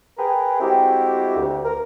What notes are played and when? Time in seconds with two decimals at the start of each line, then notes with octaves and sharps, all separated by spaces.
0.18 G#4 A#4 B4 G5
0.60 G#3 A3 C4 E4 F#4 G4
1.36 D2
1.65 A#4